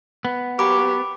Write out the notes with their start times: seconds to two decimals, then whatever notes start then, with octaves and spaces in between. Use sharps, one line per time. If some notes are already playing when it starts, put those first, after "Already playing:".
0.25 B3
0.59 F#3 A#3 G4 B5 D6